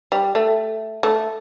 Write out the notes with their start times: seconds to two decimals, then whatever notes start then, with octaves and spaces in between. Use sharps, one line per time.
0.12 G3
0.35 A3
1.03 A3